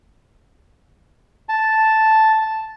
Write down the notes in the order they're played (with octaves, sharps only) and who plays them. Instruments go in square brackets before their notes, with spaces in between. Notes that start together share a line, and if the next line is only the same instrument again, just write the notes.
[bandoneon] A5